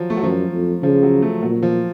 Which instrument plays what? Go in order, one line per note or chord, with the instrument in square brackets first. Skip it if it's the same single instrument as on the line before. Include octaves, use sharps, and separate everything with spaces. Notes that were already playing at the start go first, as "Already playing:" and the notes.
Already playing: [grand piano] F3 F#3
A3
F#3
[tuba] F#2 [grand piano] F3
[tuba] F2
[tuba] C#3 [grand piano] F3
[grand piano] F#3
A3
[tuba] A#2 [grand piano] F#3
[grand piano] F3